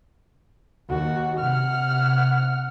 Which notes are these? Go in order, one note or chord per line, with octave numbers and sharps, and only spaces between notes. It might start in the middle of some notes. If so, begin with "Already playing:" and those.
D#2 F#4
C3 F#5 F6